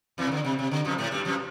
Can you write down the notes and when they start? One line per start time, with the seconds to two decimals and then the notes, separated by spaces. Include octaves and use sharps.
0.18 E2 E3
0.27 C3
0.32 D3
0.45 C3
0.59 C3
0.71 D3
0.85 F2 F3
0.98 A2 A3
1.11 G2 G3
1.25 F2 F3